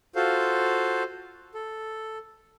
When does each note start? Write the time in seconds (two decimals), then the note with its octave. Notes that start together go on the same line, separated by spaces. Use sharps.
0.15 F4 F#4 A4 C5 F5
1.54 A4